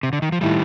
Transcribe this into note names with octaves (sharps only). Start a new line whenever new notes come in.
C3
D3
D#3
F3
A2 D#3 G3